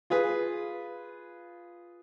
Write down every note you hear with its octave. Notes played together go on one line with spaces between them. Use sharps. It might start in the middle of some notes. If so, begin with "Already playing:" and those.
F4 G#4 B4